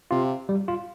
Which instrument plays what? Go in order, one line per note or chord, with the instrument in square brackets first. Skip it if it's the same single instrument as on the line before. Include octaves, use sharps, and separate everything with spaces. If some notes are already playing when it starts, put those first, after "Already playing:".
[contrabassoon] C3 [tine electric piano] F4
[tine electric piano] G3
F4